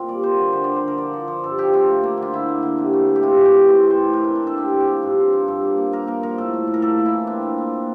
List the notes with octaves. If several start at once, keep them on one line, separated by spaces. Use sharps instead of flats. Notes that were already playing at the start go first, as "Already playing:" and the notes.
Already playing: A#2 C4 F4
G3 D5
A#3 C5
D3
D3 C5
D3 D5
C5
D3 A#4
F3 D5
F3
F3
G2 A4
F3 G4
A3 F4
A#3
A#3
D3 F4
D3 E4
A#3
D3
C3
A3
C3
G4
C3 F4
E3
G4
C3
A2 C5
C4
C5
A2
A2 A#4
C4 D4
D4
A2 A4
C4 G4
C4
G4
F3
G2
C4
F3
G2 A4
A#3
A#3
A#3 A#4
A#3 A#4
F3 A#4
A2 A4
A2
A2
A#4
A#3 A4
A#3
E4
E3
C4 D4
A#2
C4
A#2